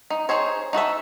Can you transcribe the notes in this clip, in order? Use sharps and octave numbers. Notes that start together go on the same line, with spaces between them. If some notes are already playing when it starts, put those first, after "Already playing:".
D#4
D#4 G#4 C5 C#5
D#4 F#4 A4 E5